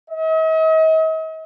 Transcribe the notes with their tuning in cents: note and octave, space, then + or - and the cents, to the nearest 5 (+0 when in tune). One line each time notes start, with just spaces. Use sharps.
D#5 +45